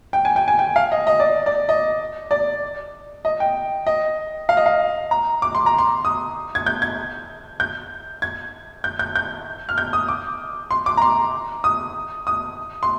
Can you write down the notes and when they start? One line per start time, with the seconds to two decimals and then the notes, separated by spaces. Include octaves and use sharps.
0.13 G5
0.25 G#5
0.36 G5
0.48 G#5
0.59 G5
0.76 F5
0.92 D#5
1.07 D#5
1.20 D5
1.46 D5
1.69 D#5
2.31 D5
3.25 D#5
3.40 G5
3.87 D#5
4.49 F5
4.57 D#5
4.66 F5
5.11 A#5
5.42 D6
5.55 C6
5.66 A#5
5.79 C6
6.05 D#6
6.55 G#6
6.67 G6
6.82 G#6
7.60 G6
8.22 G#6
8.84 G6
8.99 G6
9.16 G6
9.69 F6
9.78 G6
9.93 D#6
10.08 D6
10.71 C6
10.86 D6
10.97 A#5
11.02 C6
11.64 D#6
12.27 D#6
12.83 C6